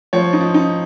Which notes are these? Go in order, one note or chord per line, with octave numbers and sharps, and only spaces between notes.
F3 C#5
D#4
F3
D#4